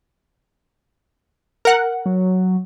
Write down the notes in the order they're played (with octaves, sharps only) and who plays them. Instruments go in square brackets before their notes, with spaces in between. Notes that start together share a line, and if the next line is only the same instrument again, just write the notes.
[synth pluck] A#4 F#5
[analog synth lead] F#3